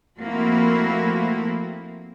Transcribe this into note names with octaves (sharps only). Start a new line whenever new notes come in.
F3 A3 A#3 C4 E4 F#4